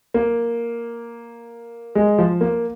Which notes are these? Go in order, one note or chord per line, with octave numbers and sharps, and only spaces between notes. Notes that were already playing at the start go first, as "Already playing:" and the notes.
A#3
G#3
F3
A#3